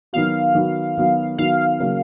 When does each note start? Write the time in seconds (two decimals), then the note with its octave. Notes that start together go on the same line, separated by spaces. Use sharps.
0.13 D#3 F#3 B3 F#4 F5
0.54 D#3 F#3 B3 F#4
0.97 D#3 F#3 B3 F#4
1.38 D#3 F#3 B3 F#4 F5
1.80 C#3 F#3 A#3